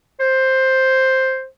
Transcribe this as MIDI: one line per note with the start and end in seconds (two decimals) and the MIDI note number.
0.20 1.45 72